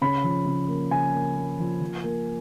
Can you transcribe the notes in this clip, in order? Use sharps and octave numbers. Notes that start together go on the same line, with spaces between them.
C#3 B5
F3
C#3
A#3
C#3 G#5
A#3
A#3
F3
F3
A#3